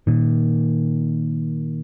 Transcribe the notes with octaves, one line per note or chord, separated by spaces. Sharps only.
A#2 D#3